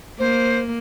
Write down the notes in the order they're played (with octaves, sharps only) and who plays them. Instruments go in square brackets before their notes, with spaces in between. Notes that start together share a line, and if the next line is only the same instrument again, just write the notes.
[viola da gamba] A#3 [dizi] C5